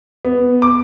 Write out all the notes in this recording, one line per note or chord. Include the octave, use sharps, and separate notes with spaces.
B3
D6